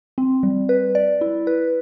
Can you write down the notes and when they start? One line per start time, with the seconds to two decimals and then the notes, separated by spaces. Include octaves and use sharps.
0.18 C4
0.43 G3
0.69 B4
0.95 D5
1.21 E4
1.47 B4